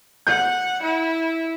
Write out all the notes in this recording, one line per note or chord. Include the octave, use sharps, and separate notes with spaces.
F#5 G6
E4